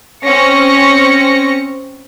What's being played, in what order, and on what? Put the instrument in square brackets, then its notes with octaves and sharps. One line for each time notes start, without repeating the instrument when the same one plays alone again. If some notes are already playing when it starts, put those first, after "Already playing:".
[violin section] C4 C#4 A#6 C#7